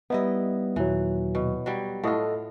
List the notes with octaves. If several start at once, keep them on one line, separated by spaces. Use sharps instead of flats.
G3 B3 D#4 E4 D#5
D#2 A#2 E3 F#3
B2
F#3 G3
A2 F4 A4 D#5 F#5